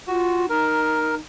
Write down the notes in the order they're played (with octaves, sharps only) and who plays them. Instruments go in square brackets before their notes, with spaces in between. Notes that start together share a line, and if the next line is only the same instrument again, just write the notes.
[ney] F4 [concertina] F#4
[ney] D#4 [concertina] A#4